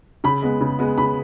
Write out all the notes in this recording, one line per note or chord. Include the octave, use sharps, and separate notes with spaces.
C#3 B5
G#3 B3
C#3
G#3 B3
C#3 B5